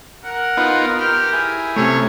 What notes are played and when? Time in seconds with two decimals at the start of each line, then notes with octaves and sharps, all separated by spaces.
0.25 A#4 F#5
0.57 B3 D#4 F4
0.98 G4 F6
1.33 E4 G#4
1.76 C3 A3 C#4 C#5